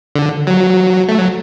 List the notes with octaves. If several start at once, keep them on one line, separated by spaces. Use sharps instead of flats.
D3
F#3
A3
F#3